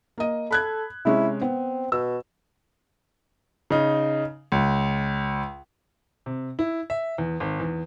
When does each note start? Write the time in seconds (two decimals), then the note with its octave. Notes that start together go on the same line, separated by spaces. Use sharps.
0.18 A#3 D#5
0.51 A4 B5 F#6 G#6
1.05 C3 G#3 C#4 E4
1.42 B3 C4
1.92 B2 E6
3.70 C#3 D#4
4.52 C#2
6.26 C3
6.59 E4
6.90 E5
7.18 E2
7.40 G#1
7.60 E2